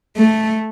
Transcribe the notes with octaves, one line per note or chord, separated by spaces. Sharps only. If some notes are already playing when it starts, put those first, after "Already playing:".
A3